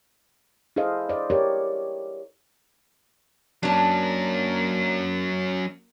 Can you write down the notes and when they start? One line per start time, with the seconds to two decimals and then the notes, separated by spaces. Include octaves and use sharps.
0.76 E4 G#4 A4 C5 D#5 F5
1.09 C5 D5 D#5
1.30 G4 A#4 C#5 D5
3.63 F#3 A#3 C#4 D4 A5